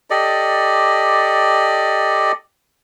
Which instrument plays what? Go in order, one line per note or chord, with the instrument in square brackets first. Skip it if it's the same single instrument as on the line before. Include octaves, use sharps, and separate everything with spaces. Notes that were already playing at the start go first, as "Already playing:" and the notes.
[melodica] G4 A4 D5 D#5